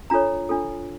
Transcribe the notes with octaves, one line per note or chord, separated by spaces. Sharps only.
D4 F4 A4 C#5 A#5
D4 F4 A4